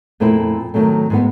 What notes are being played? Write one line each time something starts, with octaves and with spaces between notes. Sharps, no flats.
F2 A#2 A3 C4 E4
D#3 F#3 A3 C4
G#2 B3